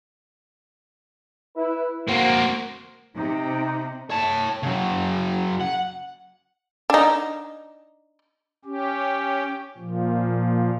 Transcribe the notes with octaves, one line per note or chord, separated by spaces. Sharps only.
E4 B4
A#3 C4 F#4 A#4 C5
C3 D#4
C#5 A5
C#3 F#3
F#5
D4 D#4
C#4 G4
A#2 F3